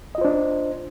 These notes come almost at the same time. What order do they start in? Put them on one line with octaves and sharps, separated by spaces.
D#5 F4 C5 D4